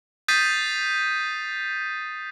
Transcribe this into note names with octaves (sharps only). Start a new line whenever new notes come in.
D#6 G6 A6 B6 C7 D#7